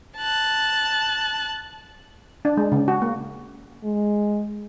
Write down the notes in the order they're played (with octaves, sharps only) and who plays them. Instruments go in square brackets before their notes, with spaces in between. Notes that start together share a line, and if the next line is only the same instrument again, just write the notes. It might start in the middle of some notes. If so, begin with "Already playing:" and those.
[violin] A5 F#6
[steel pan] D4
G#3
C#3
F#4
A#3
[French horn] G#3